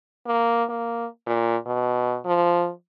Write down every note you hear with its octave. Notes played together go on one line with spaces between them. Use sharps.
A#3
A#3
A#2
B2
F3